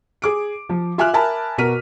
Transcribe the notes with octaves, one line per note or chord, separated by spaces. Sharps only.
G#4 D6 D7
F3
F4 E5 G#5 D6 F6 F#6
A#4 E5 G#5 A5 B5
B2 F#4 A#4 F6 B6 D#7